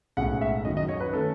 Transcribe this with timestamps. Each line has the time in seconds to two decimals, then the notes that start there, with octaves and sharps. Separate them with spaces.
0.17 B1 A2 G#3 C#4 F#5
0.41 E5
0.64 F#2 D#3 F#3 D#5
0.77 D#5
0.89 C#5
1.00 B4
1.13 D#3 A3 C#4 A4